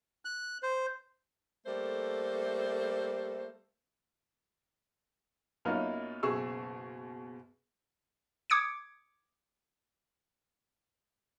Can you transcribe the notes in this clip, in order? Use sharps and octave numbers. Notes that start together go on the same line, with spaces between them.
F#6
C5
G3 A3 A#3 A4 C5
F#2 A#3 B3 C#4 D#4 F4
F#1 B2 G#4 C#6 E6
D6 D#6 G#6 C#7 D7